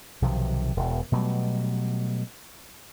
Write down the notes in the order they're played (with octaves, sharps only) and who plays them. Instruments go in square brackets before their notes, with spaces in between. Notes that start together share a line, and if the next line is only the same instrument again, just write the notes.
[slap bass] B1 C3 D#3 F3
E1 E2
B2 F#3 G3 A3